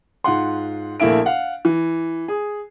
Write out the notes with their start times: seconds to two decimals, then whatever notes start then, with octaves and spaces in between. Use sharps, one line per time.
0.24 G#2 F4 F#5 C6
1.00 A#1 A3 A#3 E4 E5 D7
1.26 F5 F#5
1.65 E3
2.28 G#4